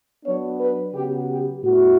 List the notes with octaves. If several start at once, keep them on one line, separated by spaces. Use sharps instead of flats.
F#3 B3 D4 C#5
B4
C#3 F#3 B3 G4
G4
A2 G3 B3 E4 F#4